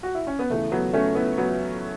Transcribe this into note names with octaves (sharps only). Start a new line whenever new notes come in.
F#4
E4
C#4
B3
E2 C#3 E3 A3
F#3 B3
A3 C#4
B3 E4
F#3 B3